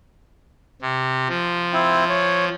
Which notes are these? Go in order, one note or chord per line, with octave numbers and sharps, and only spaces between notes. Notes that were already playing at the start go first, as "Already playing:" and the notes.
C3
F3
C4 E4
C#5